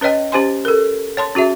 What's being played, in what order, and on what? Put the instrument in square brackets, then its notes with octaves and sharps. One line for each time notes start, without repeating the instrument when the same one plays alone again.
[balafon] C#4 B4 C#5 D#5 G5
C#4 G4 C5 G#5 C6
A4 A#4
C#5 A5 C6
C#4 F#4 G#4 E5